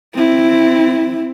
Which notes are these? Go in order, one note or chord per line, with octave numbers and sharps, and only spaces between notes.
C4 E4